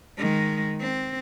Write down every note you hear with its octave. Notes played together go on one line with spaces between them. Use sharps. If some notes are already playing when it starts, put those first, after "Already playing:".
D#3 G#3
C4